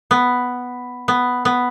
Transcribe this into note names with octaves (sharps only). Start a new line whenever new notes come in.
B3
B3
B3